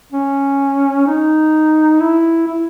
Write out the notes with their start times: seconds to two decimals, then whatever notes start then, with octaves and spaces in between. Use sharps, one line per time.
0.12 C#4
1.07 D#4
2.00 E4
2.47 E4